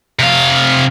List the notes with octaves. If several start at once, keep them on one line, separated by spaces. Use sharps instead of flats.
C3 F5